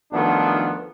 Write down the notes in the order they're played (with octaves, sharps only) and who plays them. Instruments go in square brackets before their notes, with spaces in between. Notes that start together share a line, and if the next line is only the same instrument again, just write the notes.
[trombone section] B1 D#3 F3 A3 B3 D4